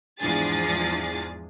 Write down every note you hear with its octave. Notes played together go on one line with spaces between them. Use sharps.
E2 G#2 F3 D4 G#4 A6